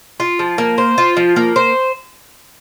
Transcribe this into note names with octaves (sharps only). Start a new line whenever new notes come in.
F4
F3
A#3
C5
F4
F3
A#3
C5